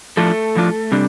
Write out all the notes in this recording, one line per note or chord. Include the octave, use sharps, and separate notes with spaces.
A2 F3 A3 D4 F4 A4
A2 F3 D4 F4
C3 G3 D4